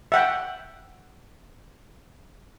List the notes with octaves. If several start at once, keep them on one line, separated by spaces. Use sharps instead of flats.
E5 F#5 G5